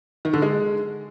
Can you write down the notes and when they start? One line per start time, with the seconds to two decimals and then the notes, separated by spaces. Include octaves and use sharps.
0.25 D#3
0.33 D3
0.42 G#3